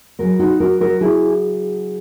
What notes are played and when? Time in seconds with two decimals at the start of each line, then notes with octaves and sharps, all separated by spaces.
0.19 C#3 F#3 F#4 A#4
0.39 D#4 F#4
0.60 F#4 A#4
0.81 F#4 A#4
1.01 E4 G#4